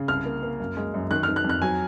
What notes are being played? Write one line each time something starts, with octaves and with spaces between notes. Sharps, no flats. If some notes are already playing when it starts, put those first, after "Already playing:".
Already playing: C#3
C2 F6
A#3
A#3
F#2
G#3
F#2
D#3 F#6
F6
D#3
F#6
F2
F#6
F#3 G#5